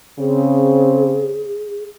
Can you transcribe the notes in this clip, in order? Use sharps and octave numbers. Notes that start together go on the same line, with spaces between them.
C#3 C4 G#4